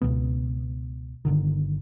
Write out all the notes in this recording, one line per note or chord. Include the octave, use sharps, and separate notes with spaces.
C#2 G#2 B2 B3
G1 D#2 D3 D#3